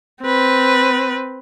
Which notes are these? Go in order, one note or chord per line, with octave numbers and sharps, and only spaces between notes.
C4 B4